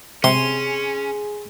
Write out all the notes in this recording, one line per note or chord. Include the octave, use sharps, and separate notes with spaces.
C3 C#4 G#4 C6